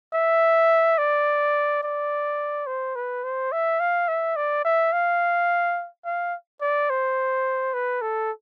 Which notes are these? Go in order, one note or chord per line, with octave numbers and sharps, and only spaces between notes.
E5
D5
D5
C5
B4
C5
E5
F5
E5
D5
E5
F5
F5
D5
C5
B4
A4